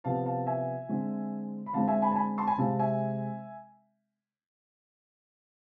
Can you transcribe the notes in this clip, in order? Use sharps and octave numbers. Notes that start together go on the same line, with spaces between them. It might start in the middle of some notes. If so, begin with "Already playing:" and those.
C3 F3 B3 F5 A5
F5 A5
E5 G#5
D3 G#3 C4
B5
D3 G#3 C4 F5 A5
E5 G#5
G#5 B5
A5
G#5 B5
A5 C6
G#5 B5
C3 G#3 C4 F5 A5
E5 G#5